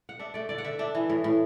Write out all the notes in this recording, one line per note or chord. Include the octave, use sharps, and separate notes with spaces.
F#5
D4 E5
A3 D5
D3 D5
F#5
D3 E5
D4 E5
E3
A2
A2